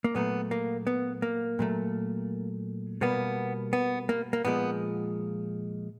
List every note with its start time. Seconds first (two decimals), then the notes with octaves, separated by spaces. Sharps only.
0.04 A#3
0.15 A#2 F#3 A3 B3
0.51 A#3
0.87 B3
1.22 A#3
1.59 A#2 F#3 A3
3.01 B2 G3 A#3 B3
3.73 B3
4.09 A#3
4.33 A#3
4.45 A#2 F3 G#3 B3